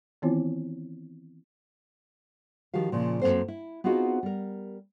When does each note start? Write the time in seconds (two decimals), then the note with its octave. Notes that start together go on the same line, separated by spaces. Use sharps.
0.22 D#3 E3 B3 C4 E4 F4
2.74 D#3 F3 F#4 G4 F5
2.92 A#2 C#3 F3
3.21 F#2 D#3 A#3 C4 A4 C5
3.48 E4
3.84 B3 C4 D#4 F4 F#4 G#4
4.23 G3 A#4